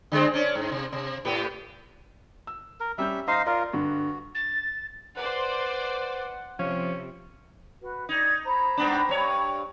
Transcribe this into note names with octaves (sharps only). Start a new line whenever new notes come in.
D3 G#3 C4
C#4 D4
G#2
C3
C3
A2 B3 G4
E6
A#4
G3 C#4 E5 G6
D#4 C5 D#5 F5 A#6
F4 A#4 D5
G2 D3 F#4
A6
B4 C5 D5 F#5
C3 F3 C#4
F#4 B4
D#4 D5 G#6
C5 A#5 B5
G2 B3 D4
G2 C#5